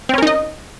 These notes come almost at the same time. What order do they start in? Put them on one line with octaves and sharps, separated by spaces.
C4 C#4 A#4 D#4 D#5